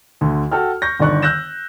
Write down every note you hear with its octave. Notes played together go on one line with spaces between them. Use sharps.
D2 D3
F#4 A4 G5 F6
C#6 G6 A#6
G1 D3 D#3 D5 C#6 F#6
E6 F#6 G6 A#6 E7